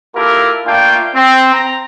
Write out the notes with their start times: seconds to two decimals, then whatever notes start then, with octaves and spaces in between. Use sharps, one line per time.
0.16 A#3 E4 F4 G4 A4 A#4
0.65 A3 A#3 D4 F4 F5 G5
1.15 C4
1.54 A#5